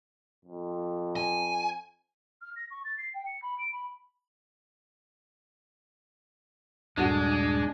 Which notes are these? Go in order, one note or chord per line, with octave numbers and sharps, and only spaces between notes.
F2
G#5
F6
A#6
C#6
A6
C7
G5
C#7
B5
D7
B5
D#1 G2 G#3 A3 D4 F#4